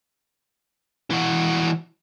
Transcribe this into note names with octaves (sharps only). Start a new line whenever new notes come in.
E3 F#4